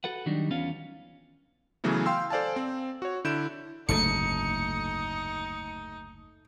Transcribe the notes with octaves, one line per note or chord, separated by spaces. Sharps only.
F#4 A4 B4 F#5
D#3 F#3 G3 D4 D#4
E2 B3 C#4 F4 F5
C#3 E3 F#3 A3 B3
F5 G5 C6 E6
A4 C5 D5 F5 G#5 A5
C4
F#4 C#5
D3 E4 G6 D7 E7
F#1 D2 G#2 A3 D#4 C#7